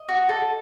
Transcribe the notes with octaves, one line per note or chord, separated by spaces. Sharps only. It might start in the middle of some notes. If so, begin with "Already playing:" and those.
Already playing: D#5
F#4
A4